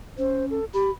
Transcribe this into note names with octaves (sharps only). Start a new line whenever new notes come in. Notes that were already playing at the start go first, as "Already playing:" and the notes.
C#4 C5
A4
G4 B5